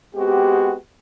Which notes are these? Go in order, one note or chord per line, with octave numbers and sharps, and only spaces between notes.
G#3 B3 C4 F#4 G4